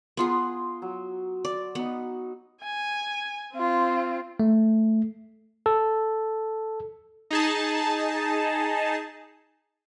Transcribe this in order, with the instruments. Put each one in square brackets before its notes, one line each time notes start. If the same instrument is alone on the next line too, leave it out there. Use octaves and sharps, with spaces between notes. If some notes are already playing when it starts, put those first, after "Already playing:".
[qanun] B3 F4 G#4 [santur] A#5 C6 D#6
[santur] F#3
[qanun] D5
[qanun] B3 [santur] D#4 F#4
[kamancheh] G#5
C4 F4
[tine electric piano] A3
A4
[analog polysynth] D#4 G#4 A5